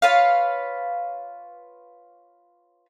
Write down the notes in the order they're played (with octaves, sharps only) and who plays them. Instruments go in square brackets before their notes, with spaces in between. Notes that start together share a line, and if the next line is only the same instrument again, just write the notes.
[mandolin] F4 B4 C#5 F5